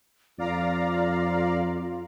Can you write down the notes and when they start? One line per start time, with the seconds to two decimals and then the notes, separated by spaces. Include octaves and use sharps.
0.39 F2 F4 D5 F5 A#5